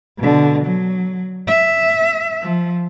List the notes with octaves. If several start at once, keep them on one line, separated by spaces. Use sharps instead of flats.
B2 D3
F#3
E5
F3